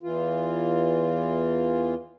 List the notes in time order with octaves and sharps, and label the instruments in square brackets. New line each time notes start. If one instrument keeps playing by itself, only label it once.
[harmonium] E2 E3 F4